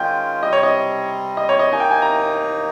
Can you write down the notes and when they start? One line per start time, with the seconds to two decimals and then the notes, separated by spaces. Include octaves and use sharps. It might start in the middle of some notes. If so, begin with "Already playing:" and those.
Already playing: D#3 G#3 C#4 F4 G5
0.42 C3 G3 C4 D#5
0.53 C#5
0.63 D#5
1.37 D#5
1.49 C#5
1.59 D#5
1.69 D#2 D#3 A#3 D#4 G#5
1.80 G5
1.91 G#5
2.02 A#5